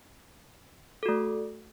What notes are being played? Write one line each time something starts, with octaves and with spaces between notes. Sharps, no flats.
A3 F#4 A4